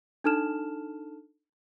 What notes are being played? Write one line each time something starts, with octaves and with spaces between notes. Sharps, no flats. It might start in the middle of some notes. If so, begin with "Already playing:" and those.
D4 D#4 A4 A5 F6 E7